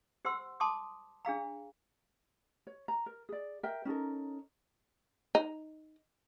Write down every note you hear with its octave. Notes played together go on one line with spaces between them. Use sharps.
G4 C5 F#5 C6 E6
A5 C6 D6 D#6
D4 G#4 F5 A#5
C#5
A#5
A#4
G#4 D5
A#4 E5 G5
C#4 D#4 A4 A#4
D#4